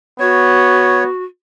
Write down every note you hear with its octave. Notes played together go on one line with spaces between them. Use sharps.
B3 F#4 C#5